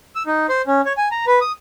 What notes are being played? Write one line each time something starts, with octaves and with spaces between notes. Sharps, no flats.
E6
D#4
C5
C#4
C#5
G#5
A#5
B4
D#6